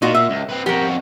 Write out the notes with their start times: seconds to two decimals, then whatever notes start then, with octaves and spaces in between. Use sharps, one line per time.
0.02 A#2 D#4 F4 F#4
0.15 E5
0.30 C#2
0.49 C4 B4
0.66 F2 F#4 G4 A#4